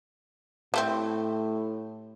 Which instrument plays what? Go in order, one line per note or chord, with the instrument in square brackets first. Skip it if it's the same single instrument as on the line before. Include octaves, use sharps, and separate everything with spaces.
[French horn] A2 [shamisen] G3 A3 C4